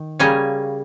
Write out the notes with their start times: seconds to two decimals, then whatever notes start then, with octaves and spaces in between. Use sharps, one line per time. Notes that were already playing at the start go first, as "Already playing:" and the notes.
Already playing: D#3
0.19 C#3 G3 A#3 C#4 G#5